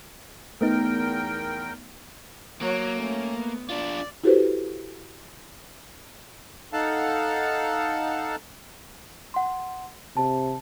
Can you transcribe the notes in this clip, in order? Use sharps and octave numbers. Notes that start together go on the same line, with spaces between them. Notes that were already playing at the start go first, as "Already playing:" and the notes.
E2 A3 B3 D#4 A#4 G5
F#3 A#3
A3 C#4
B3
D4 F4 D5
E4 F#4 G4 A4 B4 C5
D#4 A4 F5 F#5 A5
F#5 C6
C3 A5